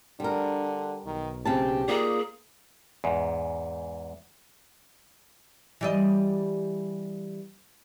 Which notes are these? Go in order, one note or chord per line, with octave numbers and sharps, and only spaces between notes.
D3 G3 D4 A#4
B1 D#3
C#3 C4 G4 A5
A#3 D#4 F4 G#4 D5
E2 G#2
E3 G3 D#5